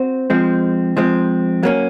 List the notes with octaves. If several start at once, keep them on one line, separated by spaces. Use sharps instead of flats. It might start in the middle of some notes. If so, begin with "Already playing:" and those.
Already playing: C4 F#4 C5
F3 G#3 C4
F3 G#3 C4
F#3 A#3 C#4